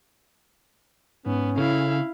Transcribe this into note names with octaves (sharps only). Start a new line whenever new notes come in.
G#2 B3 C#4
C#3 E4 A4 F5